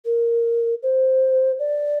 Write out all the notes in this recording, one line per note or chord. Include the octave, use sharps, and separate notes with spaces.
A#4
C5
D5